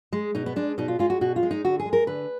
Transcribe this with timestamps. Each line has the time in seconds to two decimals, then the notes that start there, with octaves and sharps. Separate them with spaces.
0.12 G#3
0.35 B2 D#4
0.46 B3
0.56 G#3 D4
0.78 B2 D#4
0.88 F4
0.99 G#3 F4
1.10 F#4
1.21 B2 F#4
1.36 F4
1.43 G#3
1.51 D#4
1.65 D3 F#4
1.80 G#4
1.86 G#3
1.93 A#4
2.07 D3 B4